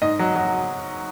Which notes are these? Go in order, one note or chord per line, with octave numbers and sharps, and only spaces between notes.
G#2 D#5
F#3
F#3